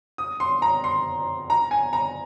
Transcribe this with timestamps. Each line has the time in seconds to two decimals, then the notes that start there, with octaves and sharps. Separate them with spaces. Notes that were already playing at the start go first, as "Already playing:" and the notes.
0.18 D#6
0.40 C6
0.62 A#5
0.84 C6
1.50 A#5
1.71 G#5
1.93 A#5